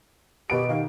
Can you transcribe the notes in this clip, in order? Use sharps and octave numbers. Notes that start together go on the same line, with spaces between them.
B2 B3 G4 D7
D#3 F5